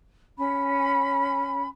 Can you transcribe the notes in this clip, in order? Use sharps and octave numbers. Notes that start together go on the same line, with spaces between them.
C#4 B5